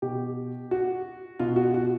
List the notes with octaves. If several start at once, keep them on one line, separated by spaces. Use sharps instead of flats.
B2 G4
F#4
B2 F4
F#4
F#4